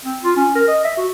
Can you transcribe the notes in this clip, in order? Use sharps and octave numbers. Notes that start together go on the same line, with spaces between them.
C4
F4
C#4
A#4
D#5
E5
F#4